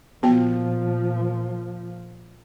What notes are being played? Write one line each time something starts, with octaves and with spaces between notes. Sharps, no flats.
A#2 F3 B3 F#4 G5